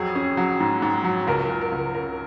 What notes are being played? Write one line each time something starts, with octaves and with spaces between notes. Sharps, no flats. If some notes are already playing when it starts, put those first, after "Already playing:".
Already playing: F2 F#3 G#4
C#4
F#3
G#2
G#2
F#3
C#2 A#4
C#2
A#4
C#2
C#3 A#4